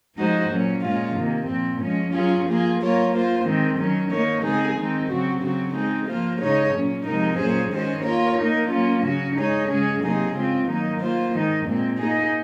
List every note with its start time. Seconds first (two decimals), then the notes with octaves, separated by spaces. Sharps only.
0.15 F3 G#3 D#4 F#4 C5
0.49 A#2 F#3 C#4
0.81 A#2 G#3 C#4 F4
1.14 C3 D#3 A#3
1.46 A#2 F3 C4
1.79 F3 G#3 C#4
2.12 F#3 C#4 F4 G#4
2.45 F3 A#3 F4 G#4
2.78 F#3 A#3 F4 A#4 C#5
3.11 A#3 F4 C5
3.44 D#3 G#3 C4
3.77 D#3 F#3 C#4
4.10 D#3 A#3 D#4 A#4 C#5
4.42 C#3 G#3 C4 D#4 G#4
4.75 D#3 G#3 C4 D#4
5.07 C#3 F#3 C4 F#4
5.40 C#3 F#3 C4 F#4
5.73 G#3 C4 D#4 G#4
6.06 F3 A#3 F4 C5
6.39 C#3 G#3 D#4 G#4 C#5
6.72 A#2 F#3 C#4
7.04 C3 F3 G#3 D#4 A#4
7.37 A#2 F#3 C#4 G#4 C5
7.70 D#3 G#3 C#4 F#4 C5
8.02 A#3 F4 A#4 C#5
8.36 A#3 D#4 A#4
8.68 F#3 A#3 C#4 F4
9.01 C#3 F#3 C#4 F#4
9.34 G#3 D#4 G#4 C#5
9.68 C#3 G#3 C#4 G#4
10.00 C3 F#3 A#3 D#4 G#4
10.33 C#3 G#3 C4 F4
10.65 D#3 F#3 A#3 D#4
10.99 A#3 F4 C5
11.31 D#3 G#3 D#4
11.65 A#2 G#3 C4
11.98 A#3 D#4 G#4